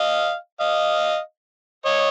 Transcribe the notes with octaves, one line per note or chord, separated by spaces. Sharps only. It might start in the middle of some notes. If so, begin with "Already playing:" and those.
Already playing: D#5 F5
D#5 F5
C#5 D#5